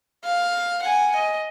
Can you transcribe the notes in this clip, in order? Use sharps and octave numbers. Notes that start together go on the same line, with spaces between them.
F5
F#5 G#5
D#5